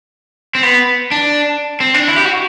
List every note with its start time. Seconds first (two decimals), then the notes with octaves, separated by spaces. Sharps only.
0.55 C4
0.63 B3
1.11 D4
1.80 C4
1.94 D4
2.08 E4
2.17 G4
2.25 F#4